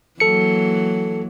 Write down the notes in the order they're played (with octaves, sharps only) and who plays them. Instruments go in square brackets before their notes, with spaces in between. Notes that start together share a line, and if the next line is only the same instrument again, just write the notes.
[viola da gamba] E3 F#3 A#3 [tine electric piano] A4 C#7